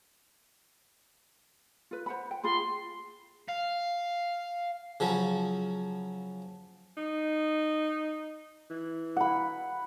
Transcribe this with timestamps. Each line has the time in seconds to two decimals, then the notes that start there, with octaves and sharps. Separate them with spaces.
1.91 F4 B4
2.06 C5 F#5 B5
2.31 G5
2.44 F4 G#4 B5 C6
3.49 F5
5.00 C#3 F3 F#3
6.97 D#4
8.70 E3
9.16 F#5 B5